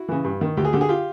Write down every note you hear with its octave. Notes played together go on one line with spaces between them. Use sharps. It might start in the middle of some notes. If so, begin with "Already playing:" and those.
Already playing: E4 F#4
C#3 E3
G2
D#3
D2 G4
G#4
D3 G4
G#4
F4 G4